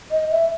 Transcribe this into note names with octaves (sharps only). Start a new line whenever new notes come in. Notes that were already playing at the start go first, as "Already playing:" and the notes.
D#5
E5